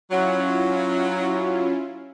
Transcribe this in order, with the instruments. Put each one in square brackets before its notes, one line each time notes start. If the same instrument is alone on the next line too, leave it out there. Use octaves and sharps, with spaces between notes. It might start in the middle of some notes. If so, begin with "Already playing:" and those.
[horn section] F#3 [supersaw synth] C#4 E4 F4